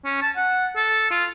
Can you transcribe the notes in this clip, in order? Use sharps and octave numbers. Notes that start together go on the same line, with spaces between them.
C#4
A5
F#5
A4
F4